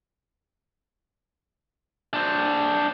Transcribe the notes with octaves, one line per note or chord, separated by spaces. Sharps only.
D4 C5